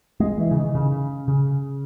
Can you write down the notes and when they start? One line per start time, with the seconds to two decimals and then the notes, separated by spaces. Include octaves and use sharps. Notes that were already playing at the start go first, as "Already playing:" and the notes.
0.20 G#3
0.39 E3
0.51 C#3
0.56 D#3
0.75 C#3
1.28 C#3